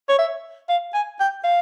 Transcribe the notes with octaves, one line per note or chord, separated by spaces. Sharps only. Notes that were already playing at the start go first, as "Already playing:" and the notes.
C#5
E5
F5
G#5
G5
F5